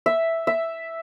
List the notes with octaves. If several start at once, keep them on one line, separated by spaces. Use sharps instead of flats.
E5
E5